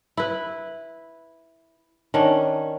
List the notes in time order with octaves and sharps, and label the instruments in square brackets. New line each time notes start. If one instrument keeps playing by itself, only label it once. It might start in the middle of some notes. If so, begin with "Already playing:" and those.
[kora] E4 B4
D#3 C#4 D4